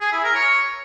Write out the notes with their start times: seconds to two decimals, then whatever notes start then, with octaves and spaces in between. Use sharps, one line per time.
0.01 G#4
0.12 E4
0.23 A#4
0.35 C#5